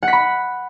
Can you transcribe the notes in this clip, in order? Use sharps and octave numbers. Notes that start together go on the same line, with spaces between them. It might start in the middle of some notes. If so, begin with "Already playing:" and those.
F#5
B6
B5